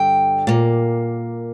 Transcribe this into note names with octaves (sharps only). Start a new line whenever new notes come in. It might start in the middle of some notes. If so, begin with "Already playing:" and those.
Already playing: G2 D3 G5
A#2 A#3